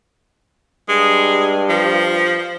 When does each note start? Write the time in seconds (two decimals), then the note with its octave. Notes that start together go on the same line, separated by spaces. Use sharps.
0.89 G2 G#3
1.69 F3